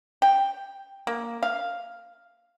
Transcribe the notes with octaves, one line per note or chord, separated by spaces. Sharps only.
G5
A#3
F5